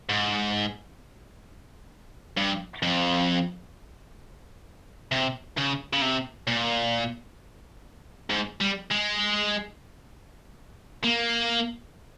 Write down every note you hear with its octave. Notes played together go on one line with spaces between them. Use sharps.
G#2
G2
F2
C3
C#3
C#3
C3
A#2
G#2
G3
G#3
A#3